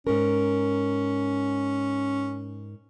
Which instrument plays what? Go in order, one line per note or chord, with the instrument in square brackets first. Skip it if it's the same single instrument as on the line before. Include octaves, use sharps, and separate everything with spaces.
[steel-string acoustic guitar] G#2 A#4 [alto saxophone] C#4